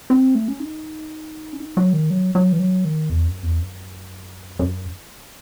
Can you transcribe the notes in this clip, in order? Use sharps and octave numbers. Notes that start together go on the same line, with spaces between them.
C4
A3
C#4
D#4
C#4
D#4
F#3
D#3
F#3
F#3
E3
F#3
D#3
E2
F#2
E2
F#2
F#2